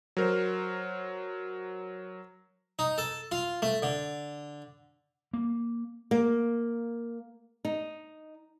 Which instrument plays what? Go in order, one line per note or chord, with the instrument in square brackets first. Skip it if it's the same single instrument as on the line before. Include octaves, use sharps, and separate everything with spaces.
[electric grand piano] F#3 A#4 C5
[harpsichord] D#4
A4
F4
A3
D3
[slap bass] A#3
[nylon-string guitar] A#3
D#4